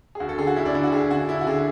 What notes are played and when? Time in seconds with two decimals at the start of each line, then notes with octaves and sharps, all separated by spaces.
0.15 G#4
0.20 D2 F#4
0.29 A4
0.38 D3 G#4
0.47 F#4
0.56 D2 E4
0.65 D4
0.74 D3 E4
0.84 F#4
0.92 D2 G#4
1.11 D3 F#4
1.29 D2 E4
1.41 F#4
1.47 D3 G#4